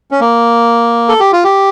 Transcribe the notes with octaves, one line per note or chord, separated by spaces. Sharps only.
C#4
A#3
A4
G4
F4
G4